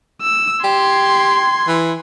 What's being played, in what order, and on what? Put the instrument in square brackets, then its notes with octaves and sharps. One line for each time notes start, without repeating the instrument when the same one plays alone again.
[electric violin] E6
[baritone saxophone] G4 [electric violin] C6 G#6
[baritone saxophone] E3